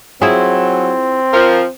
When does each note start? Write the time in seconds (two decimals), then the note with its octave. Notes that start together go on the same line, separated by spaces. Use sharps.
0.22 F#3 C4 E4 F4 G#4
1.33 F3 A#4